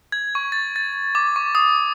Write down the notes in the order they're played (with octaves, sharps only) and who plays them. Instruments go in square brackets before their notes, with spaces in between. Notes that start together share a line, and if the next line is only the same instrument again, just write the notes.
[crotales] G#6
C#6
A6
A6
D6
C#6
D#6